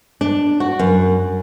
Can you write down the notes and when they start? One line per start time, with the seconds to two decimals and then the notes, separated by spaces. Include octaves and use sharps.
0.21 D4
0.60 F#4
0.79 F#2